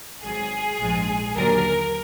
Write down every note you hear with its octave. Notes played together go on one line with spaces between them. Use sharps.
G#1 G#2 F#3 G#4
A#1 G#2 F3 G#3
D#2 D3 F#3 A#4